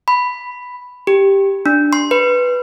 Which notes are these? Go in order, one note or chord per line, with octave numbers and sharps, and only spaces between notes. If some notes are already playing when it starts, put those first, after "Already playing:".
B5
G4
D4
C6
B4